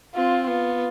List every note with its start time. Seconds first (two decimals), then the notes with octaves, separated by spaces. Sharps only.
0.15 C4 F4
0.47 B3 F4